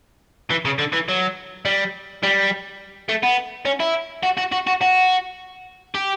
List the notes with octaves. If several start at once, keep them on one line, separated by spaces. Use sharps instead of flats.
E3
C#3
D3
E3
F#3
G3
G3
A3
B3
C#4
E4
F#4
F#4
F#4
F#4
F#4
G4